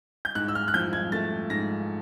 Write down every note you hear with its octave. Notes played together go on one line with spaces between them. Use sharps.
G6
G#2 F#6
E6
F6
F#6
F3 G6
G#6
A3 A6
G#2 A#6